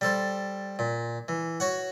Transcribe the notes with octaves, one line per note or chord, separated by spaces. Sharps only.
G3 A4 C5
A#2
E3
F#4 C#5 F#5